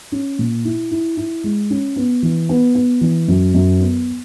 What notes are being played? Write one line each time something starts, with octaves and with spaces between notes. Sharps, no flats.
C#4
A#2
E4
E4
E4
G#3
C#4
B3
E3
B3
B3
E3
F#2
F#2
B3